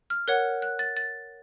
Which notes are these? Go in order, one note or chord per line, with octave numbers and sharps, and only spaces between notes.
F6
A#4 C#5 F#5 F#6
F#6
A6
A6